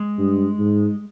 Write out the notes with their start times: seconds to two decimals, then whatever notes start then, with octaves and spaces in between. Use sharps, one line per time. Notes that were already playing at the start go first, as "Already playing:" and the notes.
Already playing: G#3
0.18 G2
0.58 G#2